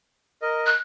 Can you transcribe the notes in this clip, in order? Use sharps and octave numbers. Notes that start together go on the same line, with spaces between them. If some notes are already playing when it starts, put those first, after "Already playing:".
A#4 D#5
F#6